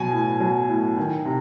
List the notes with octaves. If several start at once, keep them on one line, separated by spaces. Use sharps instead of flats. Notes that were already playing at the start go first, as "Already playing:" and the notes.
Already playing: B2 F#3 G#5
A2
F#3
A2
D#3
C3